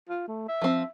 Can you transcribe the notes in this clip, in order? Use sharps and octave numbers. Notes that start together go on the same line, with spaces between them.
F4
A3
E5
F3 C4